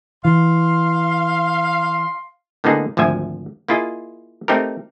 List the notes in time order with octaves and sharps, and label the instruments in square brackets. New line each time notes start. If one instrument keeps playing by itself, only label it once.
[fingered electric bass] E3 [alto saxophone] F5 [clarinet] C6
[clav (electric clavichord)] A2 D3 A#3 B3 D#4 G#4
G#1 D2 F3 E5 G#5
A#3 E4 F4 G#4 D#5
A3 C4 D#4 G4 A#4